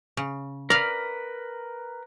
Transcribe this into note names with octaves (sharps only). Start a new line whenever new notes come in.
C#3
A#4 B4 D5 F5